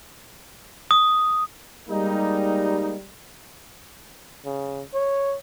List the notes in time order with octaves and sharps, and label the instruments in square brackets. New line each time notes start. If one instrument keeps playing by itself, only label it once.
[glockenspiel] D#6
[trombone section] G3 [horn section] G#3 A#3 D#4
[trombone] C#3
C#5